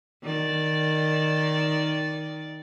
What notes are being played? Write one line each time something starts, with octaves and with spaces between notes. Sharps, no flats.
D#3 D5